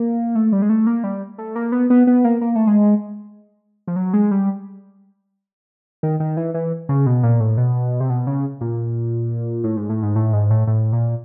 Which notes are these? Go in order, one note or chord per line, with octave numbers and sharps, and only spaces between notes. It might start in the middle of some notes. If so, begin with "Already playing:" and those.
Already playing: A#3
A3
G3
G#3
A3
A#3
G3
A3
A#3
B3
B3
B3
A#3
A#3
A3
G#3
F3
F#3
G#3
G3
D#3
D#3
E3
E3
C#3
B2
A#2
A2
B2
C3
B2
C#3
A#2
A2
G#2
A2
G#2
A2
G#2
A2
A2
A#2